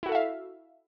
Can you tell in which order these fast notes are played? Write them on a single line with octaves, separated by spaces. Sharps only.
E4 F#4 A4 E5 F5